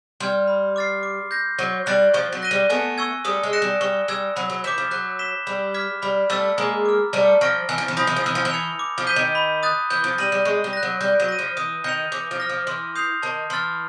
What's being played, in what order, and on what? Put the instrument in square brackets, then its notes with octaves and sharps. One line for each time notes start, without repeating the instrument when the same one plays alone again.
[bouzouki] G3 [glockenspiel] C6 F6 G#6
[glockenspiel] B5
D6 F6 A6 C7
D6
G6 A#6
[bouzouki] F#3 [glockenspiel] C#6
[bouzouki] G3 [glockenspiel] F#6 A6 D7 F#7
[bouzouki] F3 [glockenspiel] C#6
[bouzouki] F#3
[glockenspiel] F#6 A#6 D#7 G7
[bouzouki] G3
[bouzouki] A3 B3 [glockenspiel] G#5
[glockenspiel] C#6 E6 G#6
[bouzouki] G3 A3 [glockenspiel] D#6
[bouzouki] G#3
[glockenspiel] F#6 A#6 C#7 E7
[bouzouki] G3
[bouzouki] G3 [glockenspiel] C#6
[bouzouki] G3 [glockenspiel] E6 G#6
[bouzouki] F#3 [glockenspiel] B5
[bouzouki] F#3
[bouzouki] E3 [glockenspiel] D6 G6 B6 E7
[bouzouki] F3
[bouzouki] F#3 [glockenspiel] F#6
[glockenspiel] B6 E7 G7
[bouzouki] G3 [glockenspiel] B5
[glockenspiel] D6 F6 G#6 B6
[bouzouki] G3 [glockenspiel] B5
[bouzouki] G3 A3 [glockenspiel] E6 A6
[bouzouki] G#3 A#3 [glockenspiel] A#5
[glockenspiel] D6 F6
[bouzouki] G3 A3 [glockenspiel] A5
[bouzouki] F3 [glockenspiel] C#6 F6 A#6 D7
[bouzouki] E3 [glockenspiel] G#5
[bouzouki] F3
E3
[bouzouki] F3 [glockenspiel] B5 D#6 G6 A#6
[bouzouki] E3
F3
[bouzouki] E3 [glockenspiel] E6
[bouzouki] F3
E3
[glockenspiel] G#6 C#7 F7
D6
[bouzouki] F3
[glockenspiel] G6 B6 D#7 G7
[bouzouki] D#3
[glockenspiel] B5
D#6 F#6 A6
[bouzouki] E3 [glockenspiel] G6
[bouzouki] F3
[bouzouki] G3 [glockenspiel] A#6 D#7 F#7
[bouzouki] G3
[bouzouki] G#3 [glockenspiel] C#6
[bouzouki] G3
[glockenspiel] F#6 A#6
[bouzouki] F#3
[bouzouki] G3 [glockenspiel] G6
[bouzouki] F#3
[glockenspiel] A#6 D#7
[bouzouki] F3
[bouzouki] E3 [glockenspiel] D#6
[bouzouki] D#3 [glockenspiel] G6 A#6 C#7 F7
[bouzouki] E3 [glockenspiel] D6
[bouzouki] F3
[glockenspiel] F6 A#6
[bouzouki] F3
[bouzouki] E3 [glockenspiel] C6
[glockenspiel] D#6 G6 C7 F7
[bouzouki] D#3 [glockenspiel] A5
[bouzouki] E3 [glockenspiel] C6 F6 A6